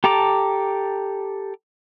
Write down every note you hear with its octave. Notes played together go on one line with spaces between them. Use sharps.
G4 A4 A5 A#5 D6